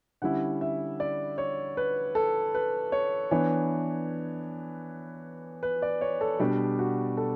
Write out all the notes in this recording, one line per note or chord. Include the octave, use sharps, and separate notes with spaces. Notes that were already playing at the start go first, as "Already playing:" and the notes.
D3 G3 C#4 E4 F#5
E5
D5
C#5
B4
A4
B4
C#5
E3 B3 D4 C#5
B4
D5
C#5
A4
B2 G3 D4 G4
F#4
A4